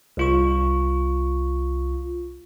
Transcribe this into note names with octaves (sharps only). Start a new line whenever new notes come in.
C2 F4 C#6